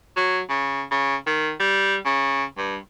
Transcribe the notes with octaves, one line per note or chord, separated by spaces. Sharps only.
F#3
C#3
C#3
D#3
G3
C#3
G2